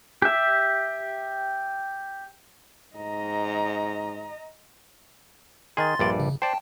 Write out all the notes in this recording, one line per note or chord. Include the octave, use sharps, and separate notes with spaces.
G4 E5
G#2 D#5 A#5
D#3 G#4 C6 A6
A#1 G2 D5
C#3
C5 D5 G5 A5